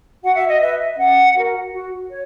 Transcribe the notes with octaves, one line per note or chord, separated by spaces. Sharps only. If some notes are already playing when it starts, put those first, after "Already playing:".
F#4 F#5
E5
D#5
B4 E5
E5
C#4 F#5
F#4 A#4
F#4
C#5